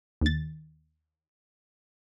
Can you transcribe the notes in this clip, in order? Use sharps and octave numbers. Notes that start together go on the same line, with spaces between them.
D#2 A6